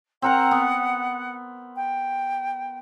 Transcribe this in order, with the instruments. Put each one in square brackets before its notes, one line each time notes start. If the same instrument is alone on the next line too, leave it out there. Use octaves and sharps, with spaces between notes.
[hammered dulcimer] C4 A#4 A#5 [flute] F#5
[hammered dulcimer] B3
[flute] G5